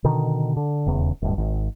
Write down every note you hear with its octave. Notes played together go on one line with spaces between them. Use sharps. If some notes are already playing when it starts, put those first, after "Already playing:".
B2 D3 D#3
D3
D#1 E2 C#3
D1 G2
G#1